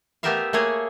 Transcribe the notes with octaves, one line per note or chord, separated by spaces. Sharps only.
A3 B3 G4 A#4 E5 F5
A3 A#3 G#4 C#5